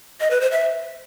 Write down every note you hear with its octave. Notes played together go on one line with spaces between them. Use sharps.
D#5
B4
C5
E5